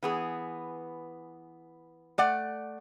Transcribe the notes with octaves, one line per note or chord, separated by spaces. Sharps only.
E3 B3 G#4
A3 D5 F#5